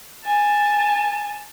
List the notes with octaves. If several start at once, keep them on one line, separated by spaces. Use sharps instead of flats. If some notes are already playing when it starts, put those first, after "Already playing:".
G#5 A5